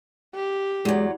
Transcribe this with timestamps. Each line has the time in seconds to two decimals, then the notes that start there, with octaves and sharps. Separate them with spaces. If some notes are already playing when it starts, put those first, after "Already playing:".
0.35 G4
0.85 E2 F#3 G#3